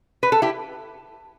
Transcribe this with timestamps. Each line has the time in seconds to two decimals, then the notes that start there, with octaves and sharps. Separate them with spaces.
0.23 B4
0.32 A4
0.42 E4 G4